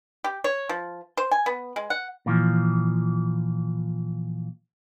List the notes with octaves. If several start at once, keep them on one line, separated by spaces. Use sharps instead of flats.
G4
C#5
F3
C5
G#5
B3
G#3
F#5
A#2 E3 F3